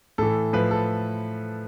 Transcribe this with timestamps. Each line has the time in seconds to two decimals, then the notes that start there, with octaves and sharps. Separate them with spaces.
0.18 A2 E3 A4
0.53 A2 F3 B4
0.71 A4